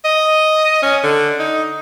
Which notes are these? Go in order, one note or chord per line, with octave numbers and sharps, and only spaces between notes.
D#5
C#4
D3
D#4